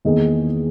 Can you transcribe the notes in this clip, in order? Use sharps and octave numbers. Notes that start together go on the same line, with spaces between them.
E2 D#3 A#3 D#4 G#4